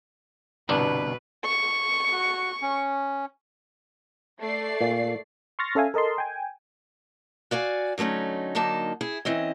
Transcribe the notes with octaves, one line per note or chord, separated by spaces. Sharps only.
G1 C2 B2 D4 B4
C#6
F#4
C#4
A3 D5 C7
A#2
C6 C#6 F6 A6 A#6
C#4 A4 E5 F5 G#5
A4 A#4 D#5 A5 C6
G5 G#5
F#4 D5 F5 G#5
D3 F#3 A3 C#4 D#4
D3 F#3 A#3 D#4 A5
E4 G#4
E3 C4 C#4 D#5